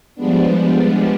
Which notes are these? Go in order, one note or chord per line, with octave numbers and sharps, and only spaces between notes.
F3 G3 G#3 B3 D4